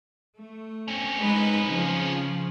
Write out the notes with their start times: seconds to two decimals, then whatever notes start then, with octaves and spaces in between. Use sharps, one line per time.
0.36 A3
0.88 C4 C#4
1.19 G#3 D#4 B4
1.66 C#3 F3